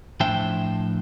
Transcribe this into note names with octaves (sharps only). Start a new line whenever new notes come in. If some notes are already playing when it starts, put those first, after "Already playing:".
A2 F3 D4 C5 E5 G5